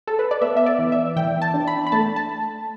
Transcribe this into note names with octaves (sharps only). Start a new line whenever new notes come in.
A4
B4
D5
B3 E5
E5
D5
E3
E5
E3 G5
A5
D4
B5
B5
A3 A5
A5